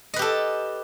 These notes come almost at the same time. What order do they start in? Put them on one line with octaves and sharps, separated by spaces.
D#5 B4 G4 A4